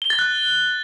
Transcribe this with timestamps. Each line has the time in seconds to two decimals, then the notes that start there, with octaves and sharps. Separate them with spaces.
0.02 G7
0.10 A6
0.19 F#6